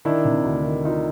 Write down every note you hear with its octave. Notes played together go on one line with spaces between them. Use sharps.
D#3 D4 E4
C3
D2
D#3
D#3 D#4 F4